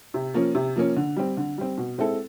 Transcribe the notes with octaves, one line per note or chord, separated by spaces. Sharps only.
C3
F3 A#3 C#4
C3
F3 A#3 C#4
D3
G3 C4
D3
G3 C4
B2
G#3 C4 E4 A4